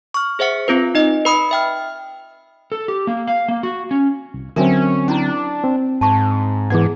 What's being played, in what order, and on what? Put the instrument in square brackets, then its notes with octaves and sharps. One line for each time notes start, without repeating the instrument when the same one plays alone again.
[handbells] C#6 F6
G#4 C5 E5 F#5 C#7
C4 F4 B4
D#4 D#5
B4 B5 D#6 C#7
E5 G5 F6
[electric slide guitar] A4
G4
A#3
F5
A#3
F#4
C#4
[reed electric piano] C2
[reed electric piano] D3 F#3 C4 [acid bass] C#4 [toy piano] A#4 E5 G#5
[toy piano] C#4 E4 A#5 [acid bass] D4
[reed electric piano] C4
[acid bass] G#2 [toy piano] A5 C#6
[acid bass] G#2 [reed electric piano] E3 B3 G#6 [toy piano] G#4 F#5